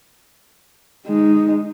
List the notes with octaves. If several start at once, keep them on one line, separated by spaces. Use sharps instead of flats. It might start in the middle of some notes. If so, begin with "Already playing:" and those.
G#3 D#4